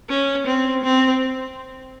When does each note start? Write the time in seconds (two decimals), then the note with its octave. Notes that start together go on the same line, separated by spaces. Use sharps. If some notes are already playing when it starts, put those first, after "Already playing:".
0.09 C#4
0.47 C4
0.84 C4